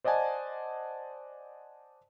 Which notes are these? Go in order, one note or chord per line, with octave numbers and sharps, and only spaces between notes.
C5 D5 D#5 F#5 G#5 A5